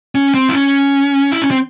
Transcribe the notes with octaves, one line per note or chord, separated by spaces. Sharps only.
C#4
C4
E4
C#4
E4
C#4
C4